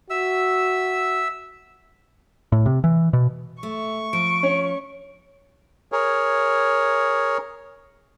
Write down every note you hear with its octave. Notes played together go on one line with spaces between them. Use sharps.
F#4 E5 E6
A2
C3
E3
B2
A3 C#6
F3 D7
C#4
G#4 A#4 C#5